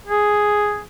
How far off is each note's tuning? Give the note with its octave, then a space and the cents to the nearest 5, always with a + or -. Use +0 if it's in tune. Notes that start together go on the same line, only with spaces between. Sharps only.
G#4 +0